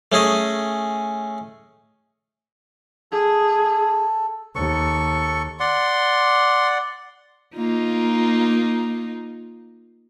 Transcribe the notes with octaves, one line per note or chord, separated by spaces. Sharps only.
A3 C#4 G#4 D#5
G#4 A4
D#2 A4 C#6
D5 F#5 C6
A#3 D#4 F4